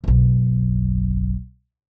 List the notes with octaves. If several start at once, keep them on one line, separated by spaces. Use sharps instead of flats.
F#1 B1